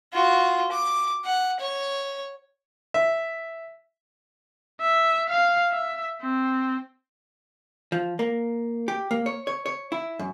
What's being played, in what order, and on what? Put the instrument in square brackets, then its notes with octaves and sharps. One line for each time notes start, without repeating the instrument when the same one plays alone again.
[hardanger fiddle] F4 F#4
D6
F#5
C#5
[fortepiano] E5
[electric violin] E5
F5
E5
C4
[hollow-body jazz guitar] F3
A#3
G4
A#3
C#5
C#5
C#5
E4
F#2